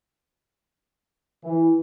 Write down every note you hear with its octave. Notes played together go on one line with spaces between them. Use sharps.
E3